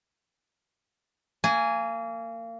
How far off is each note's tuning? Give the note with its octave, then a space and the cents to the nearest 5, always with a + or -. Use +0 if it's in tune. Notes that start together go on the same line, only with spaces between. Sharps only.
A#3 -30 G#5 +0